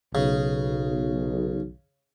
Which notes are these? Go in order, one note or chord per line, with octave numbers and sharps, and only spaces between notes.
B1 C#3